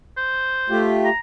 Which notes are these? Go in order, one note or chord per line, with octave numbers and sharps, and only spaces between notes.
C5
A3 F4 G4
A#5